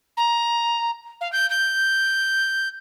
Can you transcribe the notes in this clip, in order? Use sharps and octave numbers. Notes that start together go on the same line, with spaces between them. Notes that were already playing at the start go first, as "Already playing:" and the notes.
A#5
F5
G6
G6